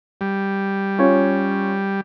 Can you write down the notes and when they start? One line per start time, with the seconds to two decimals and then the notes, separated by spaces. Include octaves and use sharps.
0.21 G3
0.99 C#4 F4 C#5